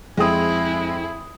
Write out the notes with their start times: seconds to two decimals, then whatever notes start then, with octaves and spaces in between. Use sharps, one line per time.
0.17 F2 G#3 C4 E4 G#4 G5 D#6